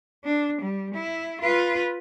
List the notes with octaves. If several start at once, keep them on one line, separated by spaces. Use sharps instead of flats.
D4
G3
E4
F4 B4